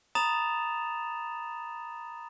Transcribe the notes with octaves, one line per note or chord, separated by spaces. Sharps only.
A#5 B5 D#6 A6 E7 F7